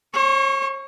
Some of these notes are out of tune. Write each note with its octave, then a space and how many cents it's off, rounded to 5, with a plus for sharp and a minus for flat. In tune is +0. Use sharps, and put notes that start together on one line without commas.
C#5 -45 C#6 +0